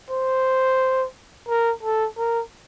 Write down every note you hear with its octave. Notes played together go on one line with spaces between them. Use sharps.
C5
A#4
A4
A#4